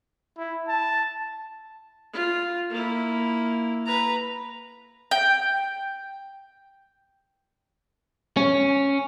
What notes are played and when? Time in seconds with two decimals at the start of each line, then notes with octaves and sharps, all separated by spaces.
0.38 E4
0.68 A5
2.13 F4
2.70 A#3 E4
3.86 B4 A#5
5.11 G5
8.37 C#4